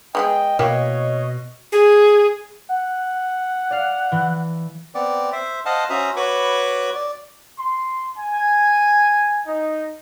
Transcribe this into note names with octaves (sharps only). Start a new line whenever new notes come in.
G#3 B3 G#4 D#5 G5
B2 A#3 E4 G4 C#5
G#4
F#5
D5 F5
E3
B3 C4 D5
C5 E5
C5 D#5 F5 F#5 A5
C#4 F#4 C5 E5 A#5 D#6
F#4 B4 C#5 B5 C#6 D6
D5
C6
G#5
D#4